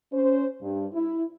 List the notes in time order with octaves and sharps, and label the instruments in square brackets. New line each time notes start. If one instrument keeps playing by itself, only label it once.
[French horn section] C#4 C5
G2
E4